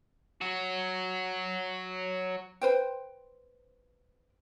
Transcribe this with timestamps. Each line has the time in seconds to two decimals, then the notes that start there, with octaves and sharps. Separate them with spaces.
0.41 F#3 F#4
2.61 B4 C5 G5